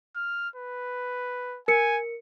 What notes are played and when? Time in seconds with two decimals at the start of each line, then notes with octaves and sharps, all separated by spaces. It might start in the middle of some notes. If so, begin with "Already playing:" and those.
0.16 F6
0.56 B4
1.68 A#4 G#5 C#7